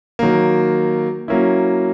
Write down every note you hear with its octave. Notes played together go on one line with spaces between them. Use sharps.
D#3 F#3 A#3
F#3 A#3 C#4 E4